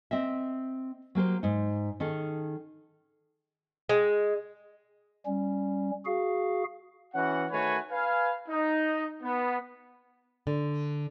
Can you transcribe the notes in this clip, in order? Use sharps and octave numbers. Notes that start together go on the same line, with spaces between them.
C4 D#5 E5
F#3 A#3 G4 C5
G#2 D#4
D#3 C#4 G#4 A4
G#3
G3 C#4
F#4 G#4 F5
E3 C#4 F#4 F#5
D#3 A3 F#4 B4 C#5 G#5
B4 F5 G#5
D#4
B3
D3